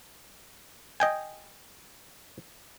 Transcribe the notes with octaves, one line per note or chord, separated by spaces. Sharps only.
D#5 G5 G#5